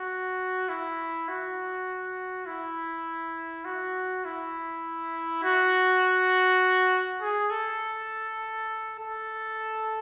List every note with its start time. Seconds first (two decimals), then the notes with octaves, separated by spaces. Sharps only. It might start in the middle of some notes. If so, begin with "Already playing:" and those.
Already playing: F#4
0.69 E4
1.28 F#4
2.46 E4
3.65 F#4
4.25 E4
5.43 F#4
7.21 G#4
7.50 A4
8.99 A4